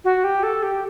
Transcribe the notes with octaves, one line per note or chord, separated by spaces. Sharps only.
F#4
G4
A4
G4